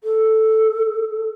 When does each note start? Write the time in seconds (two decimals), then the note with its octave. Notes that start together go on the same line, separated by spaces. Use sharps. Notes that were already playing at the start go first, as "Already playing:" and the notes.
0.04 A4